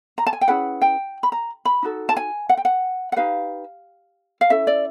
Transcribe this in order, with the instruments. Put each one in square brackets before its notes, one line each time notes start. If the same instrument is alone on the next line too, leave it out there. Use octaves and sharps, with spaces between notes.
[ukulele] A#5
A5
G#5
G5
C#4 E4 G#4 B4 F#5
G5
B5
A#5
B5
D#4 F#4 A4
A5
G#5
F#5
G5
F#5
F#5
D#4 G4 B4 F5
F5
C#4 E4 A4 E5
D5